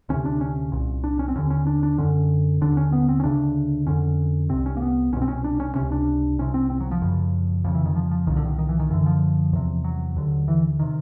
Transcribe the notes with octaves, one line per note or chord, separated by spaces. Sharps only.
D2 C3 C#4
D4
C#4
C2 A#2
D4
C#4
C4
D#2 D3 C#4
C#4
D4
D4
F#2 D3 C#4
D#2 D3 D4
C#4
B3
C4
C#4
D2 C#3 D4
F2 D3 C#4
C2 C3 C4
C#4
A#3
B3
C2 B2 C#4
C4
C#4
D4
C#4
C#2 C3 C#4
D4
C2 C3 C#4
C4
C4
F#3
F3
F#2 C#3
F2 C#3 F3
E3
D#3
F3
F3
C2 A#2 D#3
D3
D#3
D#3
E3
D#3
F#2 D3 E3
F3
E2 C3
F#3
D#2 D3
E3
C3 D#3